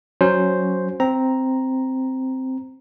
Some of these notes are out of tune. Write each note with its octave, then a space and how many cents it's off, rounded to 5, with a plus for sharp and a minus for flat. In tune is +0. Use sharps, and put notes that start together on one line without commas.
F#3 +0 C#4 +5 C5 +0
C4 -5 A#5 +0